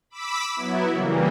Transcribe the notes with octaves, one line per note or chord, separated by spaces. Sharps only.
B5 D6 E6 B6
F#3 B3 E4
C#3 E3 G3 A#3